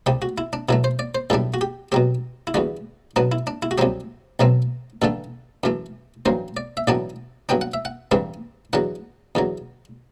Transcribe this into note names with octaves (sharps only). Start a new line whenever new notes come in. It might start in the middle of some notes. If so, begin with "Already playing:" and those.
C2 C3 G3 G4
F#4
E4
D4
B2 F#3 A3 E4
C5
D5
C5
B1 A2 G3 D4 A4
F#4
G4
B2 F#3 C4 G4
E4
E2 D3 G3 F#4
B2 F#3 B3 D4
E4
D4
E4
F#4
C2 C3 F#3 C4 G4
B1 B2 F#3 A3 C4
A1 G2 D3 A3 A4
F#2 E3 A3
A1 G2 F#3 C5
D5
E5
A1 A2 F#3 B3 D4 D5
G2 F#3 B3 D4 G5
F#5
E5
F#5
A1 G2 E3 G3 C4
E2 D3 F#3 F#5
E2 D3 F#3